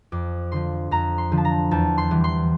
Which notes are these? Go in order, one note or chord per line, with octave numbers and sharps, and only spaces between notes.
F2 D6
D3 F3 C6
F2 A#5
C6
D3 F3
A5
A#5
E2 A5
C6
E3 G3
C6